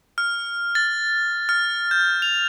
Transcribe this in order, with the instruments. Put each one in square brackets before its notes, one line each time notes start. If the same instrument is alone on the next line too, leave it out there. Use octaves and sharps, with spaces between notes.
[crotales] F6
A6
F6
G6
F7